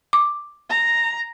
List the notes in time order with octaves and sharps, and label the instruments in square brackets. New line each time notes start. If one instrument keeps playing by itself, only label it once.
[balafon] D6
[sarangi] A#5